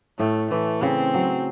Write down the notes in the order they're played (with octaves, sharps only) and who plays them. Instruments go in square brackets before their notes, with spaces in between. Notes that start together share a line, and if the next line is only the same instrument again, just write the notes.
[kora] A2 [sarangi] A3
[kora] E3 [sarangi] A3
[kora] C#3 [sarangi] C4
[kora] F#3